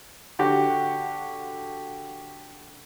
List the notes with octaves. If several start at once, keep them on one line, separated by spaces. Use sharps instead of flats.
D3 F#4 G4